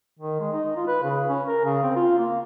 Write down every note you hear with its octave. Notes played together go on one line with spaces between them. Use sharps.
D#3
G#3
D#4
F4
B4
C#3
C#4
A#4
C#3
C4
F4
A#3